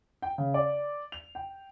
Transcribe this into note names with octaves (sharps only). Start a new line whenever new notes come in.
G5
C#3
D5
F7
G5